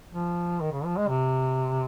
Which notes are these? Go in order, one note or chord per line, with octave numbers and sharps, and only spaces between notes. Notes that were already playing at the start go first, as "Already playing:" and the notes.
F3
D#3
C#3
F3
G#3
C3